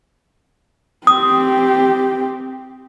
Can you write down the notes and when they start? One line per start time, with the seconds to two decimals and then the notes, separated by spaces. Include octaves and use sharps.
1.07 C4 G4 D#6